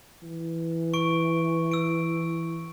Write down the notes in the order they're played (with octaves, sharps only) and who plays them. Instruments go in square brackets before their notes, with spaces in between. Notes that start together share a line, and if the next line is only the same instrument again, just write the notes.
[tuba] E3
[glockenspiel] C#6 D7
E6 D7